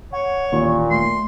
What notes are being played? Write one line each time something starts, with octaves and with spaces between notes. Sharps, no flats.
C#5 F#5
A1 D#2 A#2 C#6
A3 C6